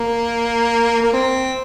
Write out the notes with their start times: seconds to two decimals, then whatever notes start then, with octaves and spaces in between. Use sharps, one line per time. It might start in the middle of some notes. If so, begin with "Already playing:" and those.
Already playing: A#3
1.02 A#3
1.13 C4